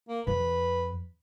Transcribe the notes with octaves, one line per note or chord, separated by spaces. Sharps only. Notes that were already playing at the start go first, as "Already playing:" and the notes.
A#3
F2 B4